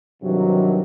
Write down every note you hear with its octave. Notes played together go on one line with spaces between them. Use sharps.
G2 C3 D#3 E3 F#3